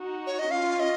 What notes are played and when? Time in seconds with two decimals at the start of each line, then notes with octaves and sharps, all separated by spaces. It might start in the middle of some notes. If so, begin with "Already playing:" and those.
Already playing: D#4 F#4
0.27 C#5
0.39 D#5
0.51 C#4 F4 F5
0.80 D#5